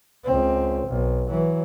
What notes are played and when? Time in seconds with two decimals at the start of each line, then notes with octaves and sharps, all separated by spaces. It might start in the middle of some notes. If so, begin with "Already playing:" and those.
0.25 C#2 C4
0.87 B1
1.27 E3 F#3